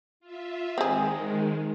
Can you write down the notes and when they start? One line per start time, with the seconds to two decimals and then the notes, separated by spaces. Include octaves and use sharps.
0.20 F4 E5
0.78 D#3 G#3 C4 G#4